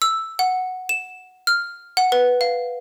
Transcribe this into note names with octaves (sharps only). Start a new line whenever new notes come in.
E6
F#5
E7
F6
F#5
B4
F5